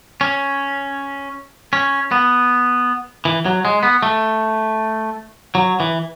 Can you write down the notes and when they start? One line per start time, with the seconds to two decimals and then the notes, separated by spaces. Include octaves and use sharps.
0.21 C#4
1.73 C#4
2.12 B3
3.25 E3
3.46 F#3
3.65 G#3
3.83 B3
4.03 A3
5.55 F#3
5.80 E3